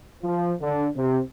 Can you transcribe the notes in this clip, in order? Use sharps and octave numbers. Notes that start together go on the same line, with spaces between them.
F3
D3
C3